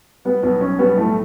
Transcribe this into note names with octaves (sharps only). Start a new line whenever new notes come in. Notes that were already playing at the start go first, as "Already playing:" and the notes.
G3 B3
B1 B3
B1 C#4
G3 B3
A2 A3